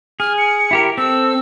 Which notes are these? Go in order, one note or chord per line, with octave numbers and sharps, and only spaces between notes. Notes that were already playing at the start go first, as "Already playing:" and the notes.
G#4 F6
C#7
E4 G4 A#4
C4 A4 E6